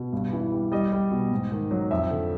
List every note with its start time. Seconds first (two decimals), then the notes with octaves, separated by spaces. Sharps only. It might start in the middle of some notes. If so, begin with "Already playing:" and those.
Already playing: B2
0.13 G2
0.33 E3
0.52 G3
0.71 G3 D#5
0.92 G3
1.11 B2
1.31 G#2
1.52 D#3
1.71 F#3
1.91 F2 E5
2.10 D3